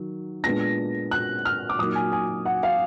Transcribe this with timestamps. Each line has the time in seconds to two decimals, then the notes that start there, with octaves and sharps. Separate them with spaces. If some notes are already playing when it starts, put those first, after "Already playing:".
Already playing: D#3 F#3
0.44 A#2 G#3 B3 D4 A#6
1.11 F#6
1.45 F6
1.69 D6
1.79 A#2 F#3 A#3 D#4 D#6
1.95 G#5
2.12 G#5
2.45 F#5
2.63 F5